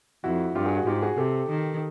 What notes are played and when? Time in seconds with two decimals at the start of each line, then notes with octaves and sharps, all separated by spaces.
0.24 F2 E4 F#4
0.55 G2 F4 G4
0.65 F#4 G#4
0.76 F#4 G#4
0.86 G#2 F4 G4
1.02 F#4 G#4
1.17 C3 G4 A4
1.50 D#3